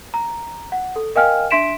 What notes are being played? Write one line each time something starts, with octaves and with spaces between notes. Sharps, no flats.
A#5
F#5
A4
A#4 D#5 F5 G5 G#5 F6
D4 E5 C6 B6 D7 E7